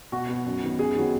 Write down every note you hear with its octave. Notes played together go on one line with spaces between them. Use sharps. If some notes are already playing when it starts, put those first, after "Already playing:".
B2 F#4
B3
F#2
D#3 B3
F#2 G#4
D#3 F#3 B3